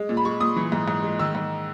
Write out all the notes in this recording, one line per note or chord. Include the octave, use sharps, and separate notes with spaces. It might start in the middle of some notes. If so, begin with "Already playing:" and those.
Already playing: G#3
A#2
B5
G#3 C#6
A#2 D#6
E3
G#2
G#2
G#3
D#3 E6
G#2